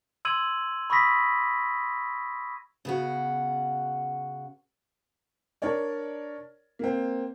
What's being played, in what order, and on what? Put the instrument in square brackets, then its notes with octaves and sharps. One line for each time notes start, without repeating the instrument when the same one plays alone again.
[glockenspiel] C6 E6 G#6 D#7 F#7
B5 C#6 D#6 E6 A#6 B6
[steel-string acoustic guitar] C#3 B3 F#4
[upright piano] D4 A#4 C#5 D5
A#3 C4